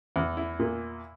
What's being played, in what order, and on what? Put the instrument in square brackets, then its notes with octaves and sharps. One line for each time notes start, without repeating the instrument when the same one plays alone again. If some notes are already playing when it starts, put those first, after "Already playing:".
[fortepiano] E2
E4
A#2